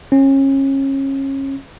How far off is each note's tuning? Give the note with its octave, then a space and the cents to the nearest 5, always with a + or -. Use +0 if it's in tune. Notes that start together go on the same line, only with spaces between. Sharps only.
C#4 -30